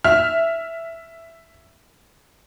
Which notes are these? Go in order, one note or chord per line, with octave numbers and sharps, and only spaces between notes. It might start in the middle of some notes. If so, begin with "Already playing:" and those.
E5 F6